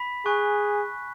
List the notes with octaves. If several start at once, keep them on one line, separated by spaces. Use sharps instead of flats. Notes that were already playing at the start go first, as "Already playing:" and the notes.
Already playing: B5 B6
G#4 G#5 C#6 F#6